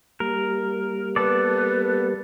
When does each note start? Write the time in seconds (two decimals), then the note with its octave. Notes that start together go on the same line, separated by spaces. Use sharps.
0.20 G3 A#3 A#4
1.16 B3 A4 B4 D5